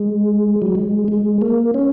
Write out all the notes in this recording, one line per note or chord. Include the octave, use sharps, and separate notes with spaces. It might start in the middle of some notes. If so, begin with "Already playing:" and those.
Already playing: G#3
F#3
G#3
G#3
A#3
C#4